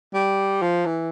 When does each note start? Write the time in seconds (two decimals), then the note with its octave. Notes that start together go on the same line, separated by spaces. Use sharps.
0.14 G3
0.62 F3
0.85 E3